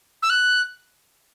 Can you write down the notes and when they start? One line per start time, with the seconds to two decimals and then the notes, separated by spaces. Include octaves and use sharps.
0.23 E6
0.30 F#6